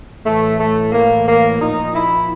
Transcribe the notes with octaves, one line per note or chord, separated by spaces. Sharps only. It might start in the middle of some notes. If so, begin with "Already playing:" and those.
A2 E3 A3
A3
A#3
A#3
A#2 F3 D#4
E4